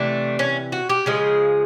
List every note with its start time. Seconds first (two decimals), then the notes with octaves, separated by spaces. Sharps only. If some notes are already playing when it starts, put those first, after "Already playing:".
Already playing: C3 E3 A3 D4
0.39 C#4
0.72 F#4
0.89 G4
1.06 C#3 F3 G#3 G#4